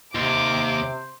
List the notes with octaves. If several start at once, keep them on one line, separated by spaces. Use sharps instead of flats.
D#2 C3 C5 D6